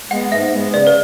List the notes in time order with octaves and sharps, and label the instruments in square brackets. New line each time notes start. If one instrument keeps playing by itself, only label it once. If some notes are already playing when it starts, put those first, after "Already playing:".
[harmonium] G#3 B3 [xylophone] F#5
[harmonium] G#2 [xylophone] E5
[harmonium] G#3 B3
[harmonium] C#3 [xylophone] D5
[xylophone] B4